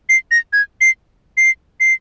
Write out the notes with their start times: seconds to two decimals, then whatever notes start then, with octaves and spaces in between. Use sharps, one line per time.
0.09 C7
0.31 A#6
0.53 G#6
0.81 C7
1.37 C7
1.80 C7